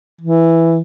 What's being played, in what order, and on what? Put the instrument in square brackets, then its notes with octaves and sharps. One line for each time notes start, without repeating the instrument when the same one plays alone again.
[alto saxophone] E3